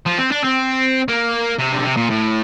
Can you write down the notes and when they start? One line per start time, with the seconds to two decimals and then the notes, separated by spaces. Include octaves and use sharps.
0.06 F3
0.19 C4
0.32 D4
0.44 C4
1.08 A#3
1.59 C3
1.72 D3
1.85 C3
1.97 A#2
2.10 A2